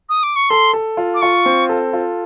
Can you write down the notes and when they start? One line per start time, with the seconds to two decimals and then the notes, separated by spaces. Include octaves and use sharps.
0.09 D#6
0.23 D6
0.36 C#6
0.50 A4 C6
0.73 A4
0.97 F4
1.15 D6
1.22 F4 C#6
1.46 C4
1.69 A4
1.93 F4